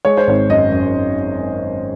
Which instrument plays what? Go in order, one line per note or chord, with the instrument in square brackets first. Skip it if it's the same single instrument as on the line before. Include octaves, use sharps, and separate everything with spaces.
[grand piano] G#3 C#5
C5
G#1 C#5
F#2 D#5
F#2